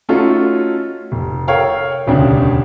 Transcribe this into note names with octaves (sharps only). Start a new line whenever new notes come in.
A3 C#4 D#4 F4 F#4 A4
F1
A4 A#4 C#5 F5 G5
E1 D2 C#3 D4 G4